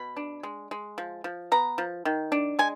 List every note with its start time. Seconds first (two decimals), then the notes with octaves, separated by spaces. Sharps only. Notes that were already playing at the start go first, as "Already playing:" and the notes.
Already playing: B2 B5
0.17 D4
0.43 G#3
0.71 G#3
0.98 F3
1.24 F3
1.52 B3 A#5
1.78 F3
2.05 D#3
2.32 D4
2.59 G#3 G#5